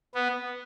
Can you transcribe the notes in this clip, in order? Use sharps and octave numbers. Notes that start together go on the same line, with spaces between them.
B3